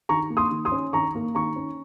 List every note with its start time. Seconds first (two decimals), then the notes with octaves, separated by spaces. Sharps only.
0.09 D#3 A#5 C#6
0.30 A#3
0.37 C6 D#6
0.51 D#3
0.65 C6 D#6
0.72 C#4
0.93 D#3 A#5 C#6
1.15 A#3
1.35 D#3 A#5 C#6
1.56 C#4